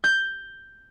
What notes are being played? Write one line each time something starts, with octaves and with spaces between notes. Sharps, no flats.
G6